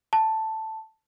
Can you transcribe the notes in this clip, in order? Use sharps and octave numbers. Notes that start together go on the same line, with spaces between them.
A5